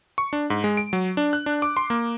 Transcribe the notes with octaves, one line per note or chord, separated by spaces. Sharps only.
C#6
D4
G#2
G#3
D7
F#3
D4
F#6
D4
D6
C6
A#3